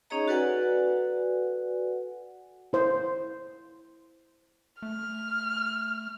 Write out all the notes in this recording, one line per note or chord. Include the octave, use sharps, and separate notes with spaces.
C#4 D#4 G#4 C#5 D#5 A#5
F#4 A4 B4 D5 F#5 G#5
E4 C5
A3 F6